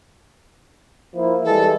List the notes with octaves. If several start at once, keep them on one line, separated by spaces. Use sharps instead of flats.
F3 A#3 E4
E3 G3 G#3 A4